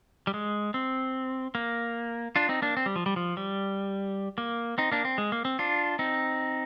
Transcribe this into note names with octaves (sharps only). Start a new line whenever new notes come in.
G3
G#3
C4
A#3
D4 F4
C4 D#4
A#3 D4
C4
G3
F3
G3
F3
G3
A#3
C4 D#4
A#3 D4
C4
G#3
A#3
C4
D4 F4
C4 D#4